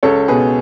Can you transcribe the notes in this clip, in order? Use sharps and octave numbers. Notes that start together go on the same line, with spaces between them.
C#2 A4 C#5
B2 G#4 B4